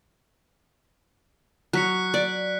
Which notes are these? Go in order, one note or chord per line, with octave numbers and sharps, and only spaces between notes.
F#3 F#6 B6 C#7
D5